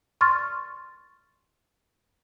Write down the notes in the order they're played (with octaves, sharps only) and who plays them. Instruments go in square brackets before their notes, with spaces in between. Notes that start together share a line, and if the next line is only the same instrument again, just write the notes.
[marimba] C6 C#6 F6 A6